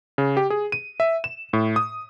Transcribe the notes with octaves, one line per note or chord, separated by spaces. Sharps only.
C#3
G4
G#4
D#7
E5
E7
A2
D#6